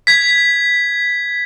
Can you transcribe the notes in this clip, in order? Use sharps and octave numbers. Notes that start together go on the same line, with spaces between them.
G#6 B6